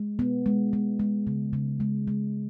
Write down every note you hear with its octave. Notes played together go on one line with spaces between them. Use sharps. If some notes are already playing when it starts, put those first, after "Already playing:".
Already playing: G#3
B3
G#3
G#3
G#3
C#3
C#3
G#3
G#3